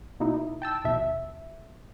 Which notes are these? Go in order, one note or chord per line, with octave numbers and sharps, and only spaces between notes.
B2 A#3 D#4 E4
G5 A5 E6
A#1 D#2 B2 E5